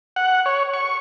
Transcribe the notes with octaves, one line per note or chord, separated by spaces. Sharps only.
F#5
C#5
C#6